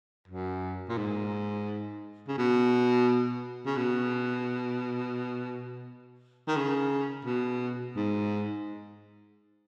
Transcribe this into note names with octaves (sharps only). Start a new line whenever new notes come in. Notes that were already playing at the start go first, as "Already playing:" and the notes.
F#2
A#2
G#2
C#3
B2
C#3
B2
D#3
C#3
B2
G#2